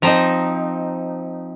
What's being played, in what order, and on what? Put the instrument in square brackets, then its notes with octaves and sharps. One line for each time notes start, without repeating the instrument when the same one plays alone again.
[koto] F3 C4 D#4 A#5